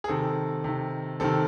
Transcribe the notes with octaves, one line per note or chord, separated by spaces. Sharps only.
G#4
C3 D#3 A4
C3 D#3
C3 D#3 A4